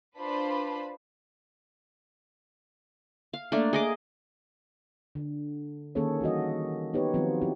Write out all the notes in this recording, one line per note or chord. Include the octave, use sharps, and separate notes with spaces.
D4 F4 B4 C5 A5 B5
F5
A3 A#3 D4
G#4 D#5 D6
D3
D#3 A#3 C#4 G#4 A4 C#5
E3 G3 F#4 D#5
B3 D#4 G4 B4 C#5
D#3 F3 F#3 B3 C4 F4
C4 E4 G4